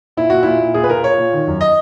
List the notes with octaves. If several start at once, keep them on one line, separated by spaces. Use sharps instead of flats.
A#2 E4
A#2 F#4
A#2 E4
A#2
A#2 G#4
B4
A#2 A#4
A#2 C#5
A#2
D#3
F#2
D#5